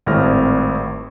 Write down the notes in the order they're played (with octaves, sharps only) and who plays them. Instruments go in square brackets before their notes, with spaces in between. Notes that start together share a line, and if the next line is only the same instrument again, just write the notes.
[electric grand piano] G#1 A2 G3 C4 F6 A#6